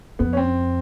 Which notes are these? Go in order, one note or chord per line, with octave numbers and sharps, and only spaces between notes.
F2 B3
C#4
C4